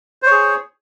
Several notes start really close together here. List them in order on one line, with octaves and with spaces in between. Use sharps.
C5 C#5 G#4